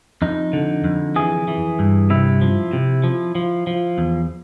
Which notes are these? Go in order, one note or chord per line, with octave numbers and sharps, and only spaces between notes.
F2 D#4
D3
F2
E3 G#4
E3
G2
C3 E4
F3
C3
F3
F3
F3
E2